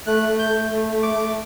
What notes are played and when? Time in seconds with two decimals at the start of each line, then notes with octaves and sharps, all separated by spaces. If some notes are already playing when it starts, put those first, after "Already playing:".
0.07 A3 F#6
0.28 A3
0.39 G6
0.49 A3
0.71 A3
0.92 A3
1.03 D6
1.14 A3